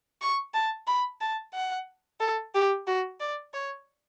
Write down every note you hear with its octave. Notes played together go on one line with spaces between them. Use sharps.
C#6
A5
B5
A5
F#5
A4
G4
F#4
D5
C#5